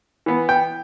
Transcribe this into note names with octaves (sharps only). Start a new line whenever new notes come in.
E3 B3
G5